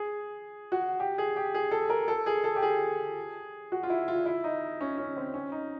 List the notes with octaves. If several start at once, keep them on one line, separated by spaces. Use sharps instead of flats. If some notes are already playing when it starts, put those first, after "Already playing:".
Already playing: G#4
F#4
G4
G#4
G4
G#4
A4
A#4
A4
G#4
A4
G4
G#4
F#4
F4
E4
F4
E4
D#4
C#4
C#4
C4
C#4
D#4